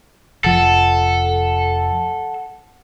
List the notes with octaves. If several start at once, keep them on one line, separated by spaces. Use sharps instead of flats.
F1 F3 A4 F#5